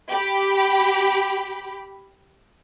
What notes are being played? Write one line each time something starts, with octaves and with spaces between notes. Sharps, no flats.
G4 B5